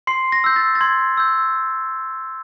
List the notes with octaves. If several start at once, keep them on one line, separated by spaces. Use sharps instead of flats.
C6 C7
A#6
E6 G6
A6
A6
C6 G#6
E6 G6